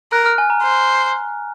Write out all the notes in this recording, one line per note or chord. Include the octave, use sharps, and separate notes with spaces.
A#4 F#6
F6
G#5
A#5
C5